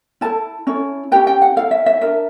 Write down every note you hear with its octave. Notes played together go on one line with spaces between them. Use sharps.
E4 A4 A5
C#4 E4 A4
C#4 E4 G4 B4 G5
G5
F#5
E4 A4 F5
E5
E5
D4 F4 A#4 E5